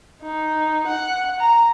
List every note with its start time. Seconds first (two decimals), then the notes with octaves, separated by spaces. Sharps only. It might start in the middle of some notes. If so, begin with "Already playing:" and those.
0.22 D#4
0.86 F#5
1.40 A#5